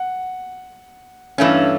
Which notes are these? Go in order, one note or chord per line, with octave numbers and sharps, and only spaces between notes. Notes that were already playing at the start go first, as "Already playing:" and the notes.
Already playing: F#5
G2 E3 A3 C#4 F5